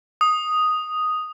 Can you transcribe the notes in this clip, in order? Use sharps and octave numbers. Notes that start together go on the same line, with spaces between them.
D#6